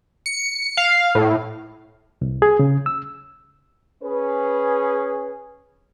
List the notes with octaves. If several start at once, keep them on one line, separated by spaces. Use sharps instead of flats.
C#7
F5
A2
C2
G#4
C#3
E6
C#4 G#4 B4